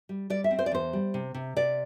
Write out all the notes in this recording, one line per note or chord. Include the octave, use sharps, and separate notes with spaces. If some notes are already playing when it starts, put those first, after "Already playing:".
G3
G3 D5
E5
C4
C5
D5
E2 C5
G3
C3
C3
C3 D5